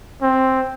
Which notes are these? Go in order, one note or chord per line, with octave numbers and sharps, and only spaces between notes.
C4